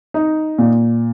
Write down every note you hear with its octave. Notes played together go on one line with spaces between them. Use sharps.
D#4
A#2